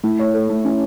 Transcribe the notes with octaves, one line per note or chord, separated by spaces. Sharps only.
A3 E4
C#5
A4
A3
C#4 E4